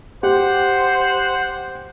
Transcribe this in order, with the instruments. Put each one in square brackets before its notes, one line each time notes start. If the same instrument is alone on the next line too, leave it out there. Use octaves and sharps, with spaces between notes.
[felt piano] G4 [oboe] C5 [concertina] F#5